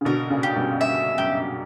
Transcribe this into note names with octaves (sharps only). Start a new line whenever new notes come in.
C#3
B2 D3 A#4
A#2 C#3
G4
G2 B2
G2 E5
F#2 G4